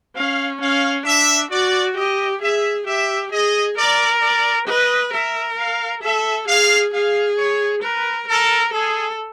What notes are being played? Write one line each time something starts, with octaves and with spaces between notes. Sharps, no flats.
C#4 F5
C#4 F5
D4 E5
F#4 D5
G4 D#5
G#4 E5
G4 E5
G#4 D#5
A#4 D5
D5
B4 D#5
A#4 E5
F5
A4 E5
G#4 F5
G#4 F5
C#5
A#4 B4
A4 A#4
G#4 A4